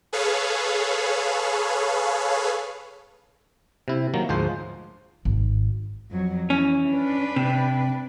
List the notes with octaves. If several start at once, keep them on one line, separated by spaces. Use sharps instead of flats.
G#4 A4 B4 C#5 F5
C3 E4
D#3 F#3 A#3
D2 G#2 F3 G#3 C5
G#1
F2 F#3
E3 C#4
D4 B4
C3